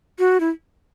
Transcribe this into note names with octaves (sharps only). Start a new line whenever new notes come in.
F#4
E4